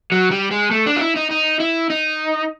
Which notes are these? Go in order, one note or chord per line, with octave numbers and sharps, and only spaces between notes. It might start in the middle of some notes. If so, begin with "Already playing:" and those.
F#3
G3
G#3
A3
D4
F4
E4
D#4
D#4
E4
D#4